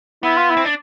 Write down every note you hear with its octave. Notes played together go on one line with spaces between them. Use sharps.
B3 E4
F4
E4
C4
D4